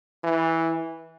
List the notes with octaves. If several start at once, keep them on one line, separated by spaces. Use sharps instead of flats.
E3